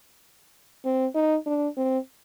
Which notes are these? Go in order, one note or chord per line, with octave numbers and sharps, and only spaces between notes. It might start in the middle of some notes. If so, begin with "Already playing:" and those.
C4
D#4
D4
C4